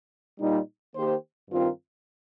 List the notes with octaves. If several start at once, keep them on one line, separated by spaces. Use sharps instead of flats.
A#2 G3 D#4
D#3 A#3 G4 C5
G2 D#3 C4 F4 A#4